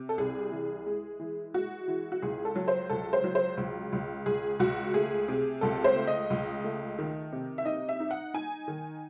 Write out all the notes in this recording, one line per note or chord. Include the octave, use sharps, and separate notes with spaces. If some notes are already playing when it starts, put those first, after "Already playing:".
Already playing: C3
A4
C2 G#4
E3
G#3
E3
G#3 F#4
E3
F#4
C#2 G#4
A4
F#3
C5
C#2 A4
C5
F#3
C5
C#2
C#2
C#2 G#4
C#2 F#4
A3 G#4
C3
C#2 A4
C5
A3
D#5
C#2
A3
D#3
C3
E5
D#4 D#5
E5
D#4
F#5
D#4 G#5
D#3